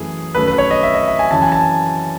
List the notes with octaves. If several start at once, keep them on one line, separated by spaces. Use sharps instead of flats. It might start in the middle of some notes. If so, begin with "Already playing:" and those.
Already playing: F#2 E3 A3 G#4
F#2 D#3 A3 B4
B4
C#5
D#5
E5
D#5
E5
G#5
F#2 C#3 E3 A5
G#5
A5